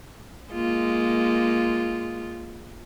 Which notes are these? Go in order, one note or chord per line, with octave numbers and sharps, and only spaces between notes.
G#3 A#3 F4